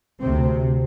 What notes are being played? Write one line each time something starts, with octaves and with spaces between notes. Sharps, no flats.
D2 C3 C4